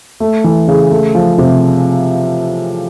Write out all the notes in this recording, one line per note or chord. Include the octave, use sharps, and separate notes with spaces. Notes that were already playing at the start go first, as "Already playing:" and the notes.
A3
E3
C#3
A3
F3
C3